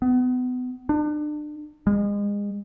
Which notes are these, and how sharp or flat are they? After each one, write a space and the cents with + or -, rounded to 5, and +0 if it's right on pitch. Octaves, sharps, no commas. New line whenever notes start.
B3 +30
D4 +35
G#3 -30